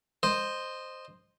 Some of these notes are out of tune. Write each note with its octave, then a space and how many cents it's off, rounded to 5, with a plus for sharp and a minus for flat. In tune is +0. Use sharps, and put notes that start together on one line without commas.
C5 +0 D#5 -15